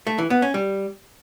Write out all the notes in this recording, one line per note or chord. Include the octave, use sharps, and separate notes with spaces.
A3
E3
B3
C#4
G3